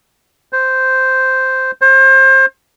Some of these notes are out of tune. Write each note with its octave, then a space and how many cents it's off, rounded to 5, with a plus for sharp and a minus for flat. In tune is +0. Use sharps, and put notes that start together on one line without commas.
C5 -5
C5 +30